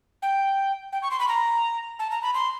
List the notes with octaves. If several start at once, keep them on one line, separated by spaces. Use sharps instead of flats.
G5
G5
C#6
C6
B5
A#5
A5
A#5
B5
C6